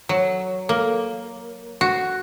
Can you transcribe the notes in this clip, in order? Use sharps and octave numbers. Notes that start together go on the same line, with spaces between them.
F#3
A#3
F#4